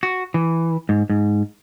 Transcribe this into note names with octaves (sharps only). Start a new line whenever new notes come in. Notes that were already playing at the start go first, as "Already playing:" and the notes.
F#4
E3
G#2
G#2